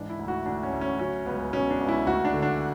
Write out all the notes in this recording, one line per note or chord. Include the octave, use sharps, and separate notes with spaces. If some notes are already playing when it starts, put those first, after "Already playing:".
Already playing: G#2 E3 D4
E4
D2
F#4
D2 D4
C#4
D2
C#4
F#3 C#4
C#2 B3
B2 C#4
D4
C#2
E4
D2 F#4
D4
D3
D4